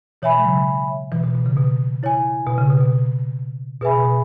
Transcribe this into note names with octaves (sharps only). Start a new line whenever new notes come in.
B2 E3 C#5 E5 G#5 B5
G#3
C#3 F#3
B2 E3
B2
B2
C#3
B2
E4 C#5 G#5
B2
C#3
B2
B2
B2 G#4 B4 E5 G#5 B5
B2
B2